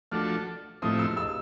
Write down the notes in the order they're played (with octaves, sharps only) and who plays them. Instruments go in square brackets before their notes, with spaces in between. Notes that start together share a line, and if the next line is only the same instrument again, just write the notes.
[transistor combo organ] F3 A3 D4 F#4 A4 [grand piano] F6
[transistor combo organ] A2 F3 A3 C4 E4 [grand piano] D#6
[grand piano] E6
E6